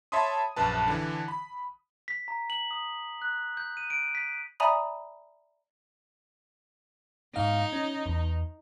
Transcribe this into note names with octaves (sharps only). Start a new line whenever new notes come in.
C#5 E5 A5 B5 C6 D#6
A#1 F#2 B4 A5
D3 E3
B5
B6
A#5
F#7
D#6
F#6
G6
D#7
D7
B6
D5 E5 G#5 A#5 B5 D#6
G#2 D#4 F5
C#4
E2